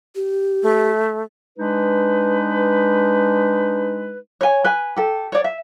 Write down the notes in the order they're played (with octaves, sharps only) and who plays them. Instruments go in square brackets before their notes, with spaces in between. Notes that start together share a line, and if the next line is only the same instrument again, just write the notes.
[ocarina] G4
[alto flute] A3
[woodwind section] G#3 D4 D#4 B4
[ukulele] C#5 G#5
B4 G#5
G4 A4
C#5 D5
E5